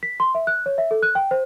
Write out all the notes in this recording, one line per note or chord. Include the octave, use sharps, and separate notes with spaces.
B6
C6
E5
F#6
C#5
E5
A4
F#6
G5
C5